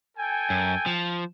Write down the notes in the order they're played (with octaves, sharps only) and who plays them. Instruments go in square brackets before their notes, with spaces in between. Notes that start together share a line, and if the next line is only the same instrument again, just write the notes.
[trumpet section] A4 G5 G#5
[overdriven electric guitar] F#2
F3